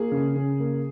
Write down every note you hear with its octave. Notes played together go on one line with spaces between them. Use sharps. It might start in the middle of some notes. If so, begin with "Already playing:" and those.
Already playing: A#3 G#4
C#3
C#3
A#3